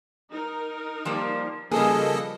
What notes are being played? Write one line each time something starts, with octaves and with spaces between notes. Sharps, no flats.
D#4 A#4
F3 G3 A#3
C#3 F3 G3 A#3 G#4 A4 B4 D#5